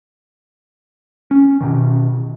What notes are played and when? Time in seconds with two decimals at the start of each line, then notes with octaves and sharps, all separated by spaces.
1.31 C#4
1.61 B2 D#3